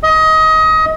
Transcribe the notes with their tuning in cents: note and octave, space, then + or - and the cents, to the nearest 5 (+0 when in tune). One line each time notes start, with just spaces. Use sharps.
D#5 +25